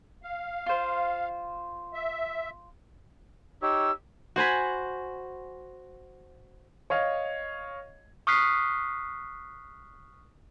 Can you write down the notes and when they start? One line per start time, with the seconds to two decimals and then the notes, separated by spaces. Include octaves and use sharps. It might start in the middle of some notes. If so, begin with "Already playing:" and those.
0.23 F5
0.66 F4 C5
1.94 E5
3.62 D#4 G4 C#5 E6
4.36 F#4 C5 G#5 B5
6.90 C#5 D#5 F5
8.27 C#6 D#6 F6 F#6 B6 C7